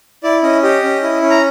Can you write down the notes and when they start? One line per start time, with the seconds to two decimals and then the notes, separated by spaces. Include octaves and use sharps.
0.23 E4 D5
0.43 C#4 D#5
0.63 G4 D#5
0.83 C#4
1.03 E4
1.22 C#4
1.30 A#5